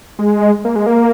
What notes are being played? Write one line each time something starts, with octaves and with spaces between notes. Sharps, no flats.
G#3
A#3
G#3
A#3